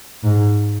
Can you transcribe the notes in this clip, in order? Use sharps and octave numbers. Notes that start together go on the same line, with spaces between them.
G#2